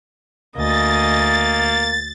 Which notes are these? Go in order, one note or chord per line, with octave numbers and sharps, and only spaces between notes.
D2 A#3 D#5 G#5 A6